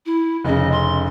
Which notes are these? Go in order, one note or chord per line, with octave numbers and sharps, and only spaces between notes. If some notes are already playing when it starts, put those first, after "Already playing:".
E4
F1 C#3 D#5
C6